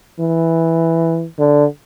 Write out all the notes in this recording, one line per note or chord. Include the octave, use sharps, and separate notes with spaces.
E3
D3